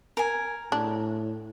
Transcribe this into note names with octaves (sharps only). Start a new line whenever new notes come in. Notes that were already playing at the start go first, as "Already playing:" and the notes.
A#4 G#5
A2 D4